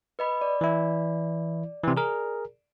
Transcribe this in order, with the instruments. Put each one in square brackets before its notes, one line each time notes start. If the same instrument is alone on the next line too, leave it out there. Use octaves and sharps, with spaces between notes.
[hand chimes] B4 D#5 B5
D5
[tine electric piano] E3 E4
C3 E3
G#4 A#4